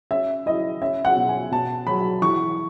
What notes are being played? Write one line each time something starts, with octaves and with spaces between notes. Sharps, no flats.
C#4 E5
E4 D#5
C#4 E5
F#5
B2
G#5
B2 A5
F#3 B5
E3 C#6